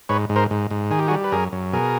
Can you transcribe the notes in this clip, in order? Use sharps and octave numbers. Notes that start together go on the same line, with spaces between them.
G#2 B4 C#5
G#2
A#4 C5
G#2
G#2
D#3 G#4
G4
F#4 G#4
G3
B4
F#2 G#4 A#4
F#2
B2 G#4 A#4